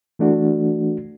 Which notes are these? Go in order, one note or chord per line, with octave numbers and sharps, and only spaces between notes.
E3 A3 D4 F#4